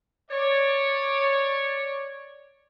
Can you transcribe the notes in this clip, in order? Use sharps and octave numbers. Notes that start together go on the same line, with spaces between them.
C#5 D5